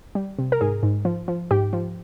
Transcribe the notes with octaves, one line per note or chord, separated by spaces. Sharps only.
G3
C3
A#4
G#2 G#4
G#2
F3
F3
G#2 G4
F3